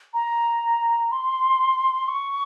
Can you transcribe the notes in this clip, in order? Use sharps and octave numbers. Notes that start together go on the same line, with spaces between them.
A#5
C6
C#6